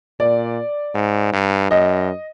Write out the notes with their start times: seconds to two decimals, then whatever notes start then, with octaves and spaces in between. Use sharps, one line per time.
0.20 A#2 D5
0.95 G#2
1.33 G2
1.71 F#2 D#5